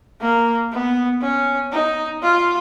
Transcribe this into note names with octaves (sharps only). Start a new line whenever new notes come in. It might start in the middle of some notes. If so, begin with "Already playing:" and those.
A#3
B3
C#4
D#4
F4